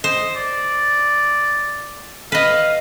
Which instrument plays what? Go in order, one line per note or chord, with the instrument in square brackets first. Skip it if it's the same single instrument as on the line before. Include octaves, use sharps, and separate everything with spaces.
[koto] C5 [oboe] D#5
[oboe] D5
[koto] B4 D#5 [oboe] F5